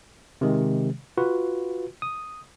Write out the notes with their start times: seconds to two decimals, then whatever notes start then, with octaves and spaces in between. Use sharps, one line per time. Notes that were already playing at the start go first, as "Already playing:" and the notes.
0.41 C3 D#3 G#3
1.17 F4 F#4 B4
2.02 D#6